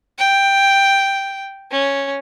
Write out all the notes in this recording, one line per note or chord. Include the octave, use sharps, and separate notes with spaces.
G5
C#4